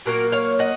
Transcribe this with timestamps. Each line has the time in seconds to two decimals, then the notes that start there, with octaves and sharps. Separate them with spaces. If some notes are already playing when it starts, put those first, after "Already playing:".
0.05 A#2 F#3 A#3 F#4 A#4
0.32 C#5 F5
0.59 D#5 F#5